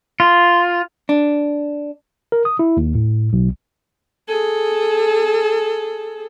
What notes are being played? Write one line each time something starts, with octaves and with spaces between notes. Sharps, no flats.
F4
D4
A#4
D#6
E4
D#2
A2
B1
G#4 A4